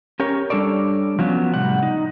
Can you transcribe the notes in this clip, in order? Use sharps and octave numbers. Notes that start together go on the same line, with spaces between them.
C#4 G4 A#4 C#5
G3 D4 A4 C#5 D5
F3 F#3 B3 C#4
A2 C3 G3 F#5
D#4